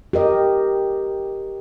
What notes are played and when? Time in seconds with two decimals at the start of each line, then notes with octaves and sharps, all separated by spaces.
0.13 G4 A#4 D#5